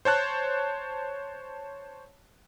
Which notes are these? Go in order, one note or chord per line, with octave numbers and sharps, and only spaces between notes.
C5 C#5 A5 F#6